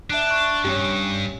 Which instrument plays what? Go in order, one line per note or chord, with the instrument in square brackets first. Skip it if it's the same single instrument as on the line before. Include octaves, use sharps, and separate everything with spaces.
[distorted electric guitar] D4 [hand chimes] E5 A5 F#6
[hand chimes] C#6 F#6
[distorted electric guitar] G2 [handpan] C#4 G4